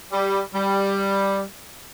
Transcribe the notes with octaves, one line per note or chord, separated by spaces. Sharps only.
G3
G3